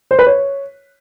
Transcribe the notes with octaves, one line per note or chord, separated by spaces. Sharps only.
C5
B4
C#5